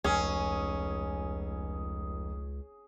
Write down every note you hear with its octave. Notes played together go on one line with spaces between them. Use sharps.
F1 C#2 C#4 G#4